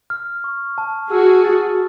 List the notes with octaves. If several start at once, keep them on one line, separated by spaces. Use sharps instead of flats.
F6
C#6
A5
F#4 G#4 E6
A6